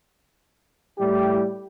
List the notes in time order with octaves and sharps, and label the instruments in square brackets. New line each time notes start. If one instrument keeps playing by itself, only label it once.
[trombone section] A2 G3 E4 G4